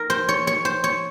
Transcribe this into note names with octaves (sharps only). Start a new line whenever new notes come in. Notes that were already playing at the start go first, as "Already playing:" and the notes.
Already playing: A#4
C5
C#5
C#5
C5
C#5